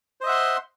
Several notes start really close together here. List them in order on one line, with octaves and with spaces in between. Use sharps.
C5 D#5 E5 F#5 C6